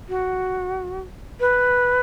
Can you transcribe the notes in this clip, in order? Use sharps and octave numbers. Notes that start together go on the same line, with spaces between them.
F#4
B4